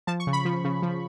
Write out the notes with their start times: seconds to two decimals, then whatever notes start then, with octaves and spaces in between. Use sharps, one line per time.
0.07 F3 A5
0.20 C#6
0.27 C#3
0.33 B5
0.45 F3
0.64 C#3
0.82 F3